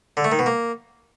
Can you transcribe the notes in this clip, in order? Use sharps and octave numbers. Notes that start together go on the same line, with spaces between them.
D3
A3
D#3
B2
A#3